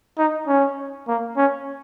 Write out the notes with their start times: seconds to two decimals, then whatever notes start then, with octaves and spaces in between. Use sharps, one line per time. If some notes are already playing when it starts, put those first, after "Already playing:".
0.18 D#4
0.48 C#4
1.08 A#3
1.37 C#4